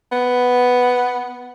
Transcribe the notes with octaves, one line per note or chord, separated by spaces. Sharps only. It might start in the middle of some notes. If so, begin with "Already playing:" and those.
B3